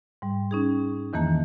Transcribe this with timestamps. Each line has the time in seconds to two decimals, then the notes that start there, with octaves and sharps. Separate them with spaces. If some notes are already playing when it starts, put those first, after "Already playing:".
0.22 G#2 G3
0.51 C#4 D#4 G#4
1.13 E2 D#3 E3 A#3 A5